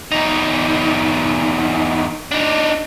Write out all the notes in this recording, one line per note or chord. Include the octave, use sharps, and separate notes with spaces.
E2 D#4
D4 D#4